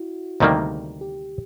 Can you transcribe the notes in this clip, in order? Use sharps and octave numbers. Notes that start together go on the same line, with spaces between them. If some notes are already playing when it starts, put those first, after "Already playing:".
Already playing: E4 F#4
D2 C3 D#3 G3 A#3
G4